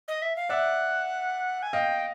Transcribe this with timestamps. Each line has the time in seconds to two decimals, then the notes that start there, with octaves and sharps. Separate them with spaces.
0.08 D#5
0.22 E5
0.36 F5
0.49 D5 E5 F#5
1.63 G#5
1.73 D#5 F5 G5